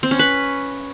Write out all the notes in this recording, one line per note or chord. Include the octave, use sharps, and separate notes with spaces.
C4
C#4
B4